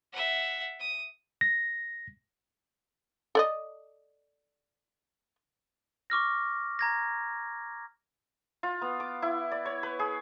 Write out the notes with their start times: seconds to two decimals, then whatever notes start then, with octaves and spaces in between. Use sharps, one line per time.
0.13 E5 F#5
0.80 D#6
1.41 A#6
3.35 A4 D5 D#5
6.10 C#6 D6 F6 A#6
6.79 A#5 G#6 A#6
8.63 F4
8.81 B3
9.00 D6
9.22 E4
9.52 D5
9.65 C#5
9.83 B4
9.99 G#4